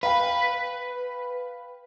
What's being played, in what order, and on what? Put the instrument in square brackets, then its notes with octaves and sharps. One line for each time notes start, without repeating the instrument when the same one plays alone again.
[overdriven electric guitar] B4 [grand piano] F5 G5 B5